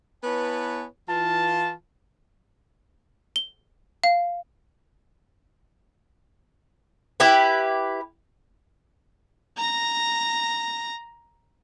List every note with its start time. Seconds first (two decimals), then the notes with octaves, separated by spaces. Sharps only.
0.24 B3 E4 B4 C#5 G#5 A5
1.09 E3 F4 A5
3.36 G7
4.04 F5
7.20 E4 G4 B4
9.56 A#5 A#6